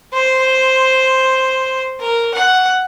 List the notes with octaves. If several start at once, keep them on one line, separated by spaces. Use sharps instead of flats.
C5
A#4
F#5